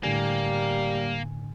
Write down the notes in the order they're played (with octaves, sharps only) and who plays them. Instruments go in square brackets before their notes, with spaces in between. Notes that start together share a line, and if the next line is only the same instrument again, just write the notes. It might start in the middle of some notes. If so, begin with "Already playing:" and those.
[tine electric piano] A2 D3 G#5 [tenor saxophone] G3 [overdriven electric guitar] A#3